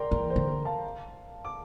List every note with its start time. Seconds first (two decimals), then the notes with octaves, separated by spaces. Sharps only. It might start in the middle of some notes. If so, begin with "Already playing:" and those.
Already playing: A#4 D5 G5 A#5 C6
0.11 E3 A#4
0.30 C5
0.36 D3
0.48 A#4
0.65 F5 A5
1.45 D6